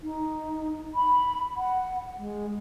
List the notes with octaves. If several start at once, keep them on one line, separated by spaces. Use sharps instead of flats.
D#4
B5
F#5
G#3